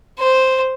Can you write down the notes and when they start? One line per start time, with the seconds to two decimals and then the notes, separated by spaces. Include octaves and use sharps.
0.19 C5